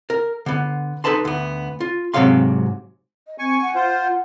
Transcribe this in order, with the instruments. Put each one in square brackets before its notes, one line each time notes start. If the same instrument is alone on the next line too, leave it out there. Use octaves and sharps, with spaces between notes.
[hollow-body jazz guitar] A#4
D3 B3
D#4 F4 A4 B4 A5 C6
D2 B3
F4
G#2 C3 F#3 C#5 F5 C6
[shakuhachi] D#5
[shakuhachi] C4 [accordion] G#5 C#6
[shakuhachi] F#5
[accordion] F4 C5